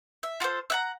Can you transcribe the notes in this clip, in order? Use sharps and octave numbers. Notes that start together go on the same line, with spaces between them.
E5
F4 F#4 A4 C5
E5 F#5 A#5